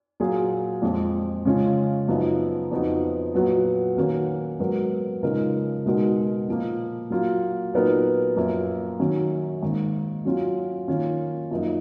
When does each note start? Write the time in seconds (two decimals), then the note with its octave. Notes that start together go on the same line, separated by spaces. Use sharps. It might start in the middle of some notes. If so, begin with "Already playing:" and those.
0.20 A#2 F#3 A#3 F4 G#4
0.82 F2 F3 G#3
1.45 C#3 G#3 C#4 F4
2.08 F#2 F3 B3 D#4
2.71 F2 F3 B3 D#4 F#4
3.34 A#2 F#3 B3 F#4
3.97 D#3 A#3 C#4 F#4 A#4
4.60 G#2 F#3 B3 F#4 A#4
5.23 C#3 F3 G#3 D#4 A#4
5.85 B2 G#3 D#4 F#4 A#4
6.48 A#2 F3 A#3
7.10 F#3 A#3 F4
7.73 A#2 F#3 B3 D#4 A#4
8.36 F#2 F3 A#3
8.99 D#3 F#3 C#4
9.62 G#2 D#3 A#3
10.25 F#3 C#4 F4
10.88 D#3 A#3 C#4 F4
11.51 F#2 F3 A#3 D#4 A#4